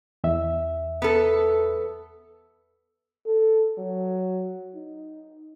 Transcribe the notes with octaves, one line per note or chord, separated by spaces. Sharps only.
E2 E5
B3 A4
A4
F#3
D#4